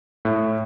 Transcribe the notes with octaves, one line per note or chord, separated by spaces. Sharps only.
A2